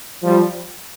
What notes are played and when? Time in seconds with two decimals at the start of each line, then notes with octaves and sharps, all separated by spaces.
0.23 F3 G3